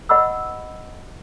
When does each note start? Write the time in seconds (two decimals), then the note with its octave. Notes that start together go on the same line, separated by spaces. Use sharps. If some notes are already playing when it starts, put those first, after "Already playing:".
0.09 B4 D#5 F#5 B5 D6 E6